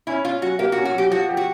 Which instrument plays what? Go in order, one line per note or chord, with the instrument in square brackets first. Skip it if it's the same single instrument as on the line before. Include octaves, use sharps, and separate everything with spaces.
[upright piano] C#4 [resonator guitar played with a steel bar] E4
[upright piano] C#4 [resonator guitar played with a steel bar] F4
[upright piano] F#3 [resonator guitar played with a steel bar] F#4
[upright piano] A#3 [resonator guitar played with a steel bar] G4
[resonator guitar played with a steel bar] F#4
[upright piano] C#4
[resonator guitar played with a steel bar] F#4
[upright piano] F#3 [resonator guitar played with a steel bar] G4
[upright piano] F3 [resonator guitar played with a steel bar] F#4
[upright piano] G4
[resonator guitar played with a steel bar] F#4